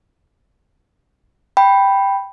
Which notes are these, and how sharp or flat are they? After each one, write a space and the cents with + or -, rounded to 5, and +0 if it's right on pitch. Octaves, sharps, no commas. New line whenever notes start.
G5 +0 B5 +0